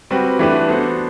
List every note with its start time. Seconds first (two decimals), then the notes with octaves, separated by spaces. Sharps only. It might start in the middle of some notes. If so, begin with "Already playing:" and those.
0.11 G3 C4 F#4 B4
0.39 E3 A3 D4 G4 B4
0.68 B3 D4 F#4 A4 C5